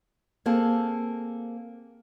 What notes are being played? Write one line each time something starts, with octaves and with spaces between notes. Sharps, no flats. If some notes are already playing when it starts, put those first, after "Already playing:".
A#3 C4 G#4 A4